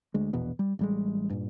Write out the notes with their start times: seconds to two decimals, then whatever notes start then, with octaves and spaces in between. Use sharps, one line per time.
0.14 D2 G#3
0.33 A#1 E2 B2 B3
0.59 G3
0.79 A1 G3 G#3
1.30 G2 A#2